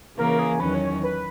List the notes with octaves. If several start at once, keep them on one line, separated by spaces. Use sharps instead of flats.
C#3 E3 A#3 A#4
G#4
E2 D#3 F#3 C#4 B4
C#5
B4